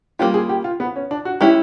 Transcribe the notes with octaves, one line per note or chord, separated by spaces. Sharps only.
G3 A#3 C#4 F4 G4
G#4
G4
F4
B3
C#4
D4
F#4
G#3 C#4 E4 G4